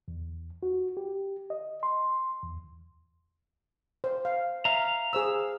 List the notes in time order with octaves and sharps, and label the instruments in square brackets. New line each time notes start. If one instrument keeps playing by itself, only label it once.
[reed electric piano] E2
F#4
G4
D#5
C6
E2
[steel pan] C5
F5
[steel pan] E5 [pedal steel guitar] F5 A#5
[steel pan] G#4 C5 E6